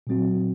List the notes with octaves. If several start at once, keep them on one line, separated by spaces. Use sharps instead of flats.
A#2 F#3 C4 F#4